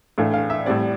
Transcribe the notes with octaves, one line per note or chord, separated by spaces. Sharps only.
A2 E3 A3 D4 F5
F5
E5
A2 G3 C4 D5